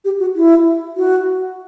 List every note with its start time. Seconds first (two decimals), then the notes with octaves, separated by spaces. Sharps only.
0.05 G4
0.19 F#4
0.35 E4
0.97 F#4